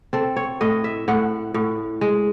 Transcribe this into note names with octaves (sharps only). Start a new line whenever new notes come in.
C4 A4
C#5
A2 D#5
E5
A2 F#5
A2
G#3